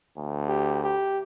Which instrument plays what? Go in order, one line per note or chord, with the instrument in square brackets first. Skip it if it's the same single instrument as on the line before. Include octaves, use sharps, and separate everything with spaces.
[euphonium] D2
[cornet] G4
G4